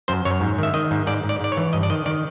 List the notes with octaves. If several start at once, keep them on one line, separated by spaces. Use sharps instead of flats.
F#2 C5
F#2 C#5
G#2
D#3 E5
D#3 D#5
G#2
G#2 D5
G#2
D5
G#2 D5
C#5
E3
G2 D#5
D5
D#3 D#5
D#3 D5